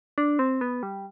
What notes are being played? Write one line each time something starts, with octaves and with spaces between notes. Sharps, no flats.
D4
C4
B3
G3